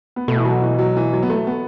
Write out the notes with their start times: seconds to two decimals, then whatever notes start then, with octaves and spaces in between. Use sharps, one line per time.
0.16 B3
0.28 B2 A3
0.37 E3
0.45 F#3
0.62 E3
0.78 F#3
0.97 E3
1.13 F#3
1.23 B3
1.30 A3
1.47 B3